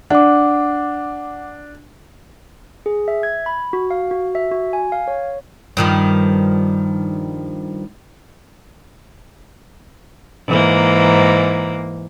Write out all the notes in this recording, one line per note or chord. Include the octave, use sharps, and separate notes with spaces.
D4 F#5 D6
G#4
E5
G#6
B5
F#4
F5
F#4
E5
F#4
G#5
F5
C#5
G2 D#3 F3
G#2 E3 A#3